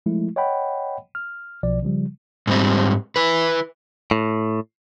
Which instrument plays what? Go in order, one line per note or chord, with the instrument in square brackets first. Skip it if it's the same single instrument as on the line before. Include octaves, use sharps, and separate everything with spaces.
[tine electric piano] F3 G#3 A3 E4
C#5 D#5 F#5 G5 B5
F6
B1 B2 F3 D5
C#3 F3 G3
[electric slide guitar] G#2 G3 C4
E4 B4
[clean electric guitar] A2